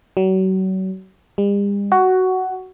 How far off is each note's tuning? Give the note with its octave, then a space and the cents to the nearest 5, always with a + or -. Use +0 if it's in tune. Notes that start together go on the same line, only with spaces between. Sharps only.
F#3 +35
G3 +45
F#4 +10